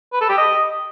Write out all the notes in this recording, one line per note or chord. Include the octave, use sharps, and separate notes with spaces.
B4
A4
G4
D#5